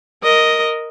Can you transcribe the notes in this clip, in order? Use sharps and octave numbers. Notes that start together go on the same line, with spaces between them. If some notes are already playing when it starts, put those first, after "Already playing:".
A#4 D#5